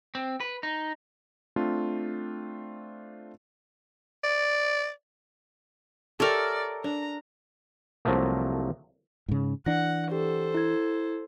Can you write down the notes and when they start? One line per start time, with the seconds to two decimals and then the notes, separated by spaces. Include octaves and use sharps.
0.15 C4
0.40 B4
0.63 D#4
1.56 A3 C4 D4 F4
4.24 D5
6.20 G4 A4 A#4 C#5 D5 E5
6.84 D4 A#5
8.05 C2 F3 F#3 A3 A#3
9.28 G#2 C#3
9.66 E3 D4 F#5 A#6
10.11 G4 A4 C5
10.54 E4 G#6